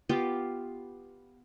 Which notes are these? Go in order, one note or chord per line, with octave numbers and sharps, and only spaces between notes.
B3 F4 G4